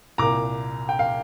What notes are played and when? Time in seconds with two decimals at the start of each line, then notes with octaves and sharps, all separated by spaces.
0.18 C2 A#2 A#5 D6
0.89 G5
0.99 F5